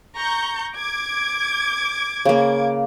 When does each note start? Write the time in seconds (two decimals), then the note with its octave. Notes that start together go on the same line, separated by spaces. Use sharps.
0.16 A#5 C#6 G6
0.76 D6 G#6
2.25 C#3 A#3